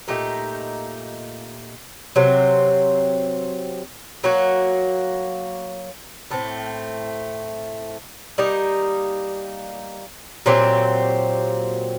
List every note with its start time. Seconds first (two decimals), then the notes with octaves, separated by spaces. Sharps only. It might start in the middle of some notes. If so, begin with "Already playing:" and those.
0.08 A#2 A3 D#4 G4
2.16 C3 F#3 C4
4.24 F#3 A#3 F#4
6.30 A2 A3 C4
8.38 G3 A#3 D#4
10.46 A#2 F#3 C4 G4